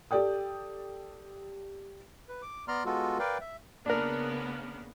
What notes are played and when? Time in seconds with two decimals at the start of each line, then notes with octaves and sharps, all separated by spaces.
0.11 G4 A4 D5 G5 D#6
2.29 B4
2.42 D6
2.68 B3 D5 A#5 C6 F6
2.85 G#3 B3 F4 F#4 A4
3.19 A#4 B4 D5 F5 G5
3.41 E5
3.86 C#3 A#3 B3 D4 A#4